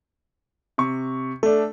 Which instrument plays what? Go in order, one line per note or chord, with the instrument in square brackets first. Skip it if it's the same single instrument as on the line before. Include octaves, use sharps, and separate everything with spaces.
[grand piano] C3 C#6
[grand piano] A3 D4 [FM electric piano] A4